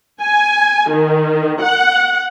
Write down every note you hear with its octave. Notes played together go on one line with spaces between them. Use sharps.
G#5
D#3
F#5